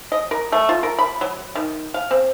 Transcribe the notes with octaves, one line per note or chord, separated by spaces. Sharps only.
D#5
A#4
A3
F4
A#4
B5
F#3
D#3
F5
C4